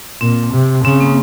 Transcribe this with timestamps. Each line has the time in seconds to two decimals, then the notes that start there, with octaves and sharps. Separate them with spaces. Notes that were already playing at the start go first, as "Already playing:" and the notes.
0.21 A#2 C4
0.53 C3
0.84 C#3 C4
1.00 A#3